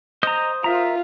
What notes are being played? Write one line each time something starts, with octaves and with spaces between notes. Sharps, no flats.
C5 D#5 A#5 D#6 G6
F4 A#4 E5 A#5